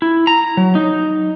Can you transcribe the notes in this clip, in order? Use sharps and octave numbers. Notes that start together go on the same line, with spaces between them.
E4
A#5
F#3
D#4